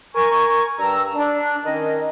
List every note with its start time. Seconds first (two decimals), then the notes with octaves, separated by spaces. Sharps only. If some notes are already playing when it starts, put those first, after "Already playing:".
0.15 A#4 G#5 C#6
0.79 G2 A#5 E6
1.15 D4
1.64 D#3 C#4 D#5